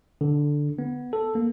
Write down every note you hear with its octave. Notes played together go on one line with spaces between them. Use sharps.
D3
B3
A4
A#3